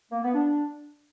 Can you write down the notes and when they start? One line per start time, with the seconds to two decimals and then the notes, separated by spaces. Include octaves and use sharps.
0.11 A#3
0.23 B3
0.34 D4